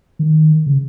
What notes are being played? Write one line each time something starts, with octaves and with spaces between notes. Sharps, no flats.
D#3
C#3